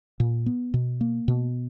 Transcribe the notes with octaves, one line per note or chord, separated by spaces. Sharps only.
A#2
B3
B2
A#3
B2